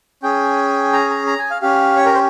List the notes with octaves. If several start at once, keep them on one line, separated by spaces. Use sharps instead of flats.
C#4 G#4 G5
A#5
A#5
A#5
G#5
F5
C#4 G4 F5
C#5
A#4
C5